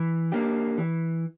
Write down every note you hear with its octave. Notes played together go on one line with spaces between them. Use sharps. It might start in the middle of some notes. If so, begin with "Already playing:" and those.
Already playing: E3
A#3 D4 G4
E3